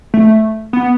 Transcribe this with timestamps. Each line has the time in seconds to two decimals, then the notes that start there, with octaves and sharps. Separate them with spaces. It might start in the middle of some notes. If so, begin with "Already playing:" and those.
0.14 A3
0.73 B3